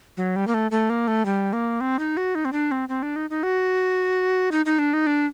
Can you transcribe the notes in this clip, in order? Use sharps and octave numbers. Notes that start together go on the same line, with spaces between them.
F#3
G3
A#3
A3
A3
A#3
A3
G3
A#3
C4
D#4
F#4
D#4
C4
D4
C4
C4
D4
D#4
D#4
F#4
D#4
D#4
D4
D#4
D4